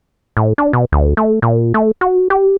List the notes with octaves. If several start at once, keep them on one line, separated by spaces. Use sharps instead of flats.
A2
D4
B2
D2
A3
A#2
A3
F#4
G4